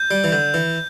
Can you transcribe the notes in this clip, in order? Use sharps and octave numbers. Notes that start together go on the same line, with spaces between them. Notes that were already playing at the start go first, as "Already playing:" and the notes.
Already playing: G6
G3
E3
D3 G6
E3